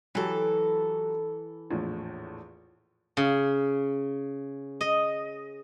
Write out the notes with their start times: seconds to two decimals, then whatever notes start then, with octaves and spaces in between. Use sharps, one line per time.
0.15 E3 F#3 F#4 G4 A4
1.70 A#1 E2 A2
3.17 C#3
4.81 D#5